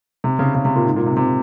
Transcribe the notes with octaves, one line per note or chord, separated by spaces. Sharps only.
C3
C#3
C#3
C3
A#2
G#2
A#2
C3
C3